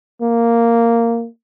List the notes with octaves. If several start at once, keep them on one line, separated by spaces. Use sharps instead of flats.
A#3